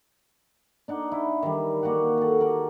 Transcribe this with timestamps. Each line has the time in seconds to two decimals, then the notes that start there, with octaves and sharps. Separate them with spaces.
0.88 D4 D#4 F#5
1.12 E4
1.43 D#3 E3 G3
1.83 A#3 F#4 G4 F#5
2.18 A4 F#5
2.40 G4 A#4 F#5